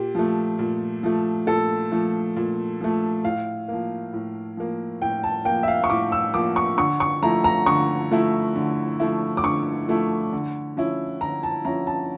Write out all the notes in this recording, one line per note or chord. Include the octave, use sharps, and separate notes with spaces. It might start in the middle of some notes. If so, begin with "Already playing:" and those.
Already playing: A#2 G4
F3 A3
A#2
F3 A3
A#2 A4
F3 A3
A#2
F3 A3
A2 F5
F3 A#3
A2
F3 A#3
A2 G5
A5
F3 A#3 G5
E5
F5
C#6
A2 D6
E6
F3 A#3 D6
C#6
D3 C#6
C#6
F3 A3 E4 A#5
A#5
D3 C#6
F3 A3 E4
D3
F3 A3 E4
D6
D3 C#6
F3 A3 E4
D3
F3 C#4 E4
D3 A#5
A5
F3 C#4 E4 A#5
A5